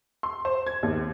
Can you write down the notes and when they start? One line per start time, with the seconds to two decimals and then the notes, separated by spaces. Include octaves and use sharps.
0.23 C6
0.45 C5
0.67 G#6
0.83 D#2